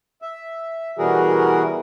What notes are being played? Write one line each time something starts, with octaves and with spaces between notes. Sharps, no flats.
E5
B2 E3 G3 F#4 G#4 A#4